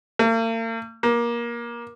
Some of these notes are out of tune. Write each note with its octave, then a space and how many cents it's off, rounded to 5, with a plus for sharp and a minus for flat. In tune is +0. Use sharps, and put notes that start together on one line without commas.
A#3 -45
A#3 +20